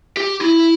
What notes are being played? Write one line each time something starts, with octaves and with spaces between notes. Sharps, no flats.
G4
E4